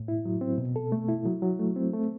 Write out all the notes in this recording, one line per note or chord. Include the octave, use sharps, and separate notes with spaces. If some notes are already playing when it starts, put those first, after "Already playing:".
Already playing: A2
E4
F#3
C4
B2
A4
A3
E4
F#3
F#3
A3
C4
A3